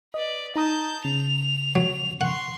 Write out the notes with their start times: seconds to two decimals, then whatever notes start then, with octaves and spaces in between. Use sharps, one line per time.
0.14 B4 D5 D#5
0.56 D#4 A5 A#5 D#6 G6
1.05 C#3 F7
1.76 F#3
2.21 F#5 C6 C#6